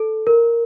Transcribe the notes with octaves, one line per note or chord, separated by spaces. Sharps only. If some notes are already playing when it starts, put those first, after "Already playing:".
Already playing: A4
A#4